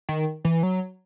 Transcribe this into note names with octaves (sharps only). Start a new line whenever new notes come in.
D#3
E3
F#3